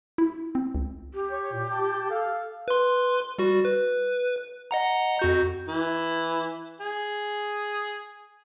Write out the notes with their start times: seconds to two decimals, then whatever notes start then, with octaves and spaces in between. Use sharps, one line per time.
0.18 E4
0.55 C4
0.75 C#2
1.14 G4
1.30 C#5
1.52 A#2
1.70 G5 A5
2.10 A4 F5
2.68 B4 C6
3.38 G3 F#4
3.65 B4
4.71 D#5 F#5 A#5
5.19 F2 F#4 G6
5.69 E3
6.80 G#4